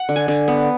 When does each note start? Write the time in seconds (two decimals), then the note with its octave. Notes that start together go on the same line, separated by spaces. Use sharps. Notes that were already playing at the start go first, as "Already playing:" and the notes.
Already playing: F#5
0.09 D3
0.16 G#5
0.28 D3
0.48 B3